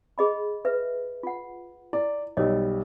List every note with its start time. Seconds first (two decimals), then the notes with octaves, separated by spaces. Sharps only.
0.18 G#4 D#5 B5
0.65 B4 E5
1.23 F4 F#5
1.93 E4 D5
2.37 B1 G3 A#4 C#5 D#5